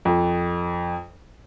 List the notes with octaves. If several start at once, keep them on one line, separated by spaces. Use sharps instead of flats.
F2